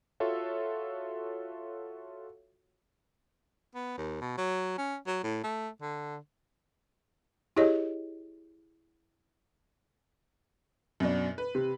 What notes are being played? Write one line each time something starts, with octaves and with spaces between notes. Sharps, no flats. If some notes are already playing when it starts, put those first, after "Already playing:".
F4 F#4 A4 C#5 E5
B3
D#2
B2
F#3
C#4
F#3
A2
A3
D3
E4 G4 G#4 C#5 D#5
F#2 B2 D4
B4
C3